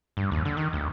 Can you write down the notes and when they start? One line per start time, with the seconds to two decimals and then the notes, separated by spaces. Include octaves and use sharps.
0.17 G2
0.31 D#2
0.45 D3
0.57 D#3
0.73 D2